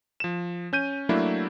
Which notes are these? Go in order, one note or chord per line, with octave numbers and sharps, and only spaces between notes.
F3 E7
C#4 G6 D#7
F#3 A3 A#3 D4 E4